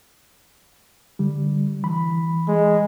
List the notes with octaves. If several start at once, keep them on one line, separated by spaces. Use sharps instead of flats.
D3 G3
E3 B5
G#3